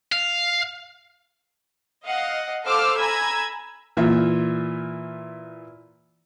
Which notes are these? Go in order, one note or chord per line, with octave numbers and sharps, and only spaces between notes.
F5
D#5 F5 F#5
A4 C5 F5 D6 E6 F6
G#5 A#5 B5 E6 G#6
A#2 E3 F4 E5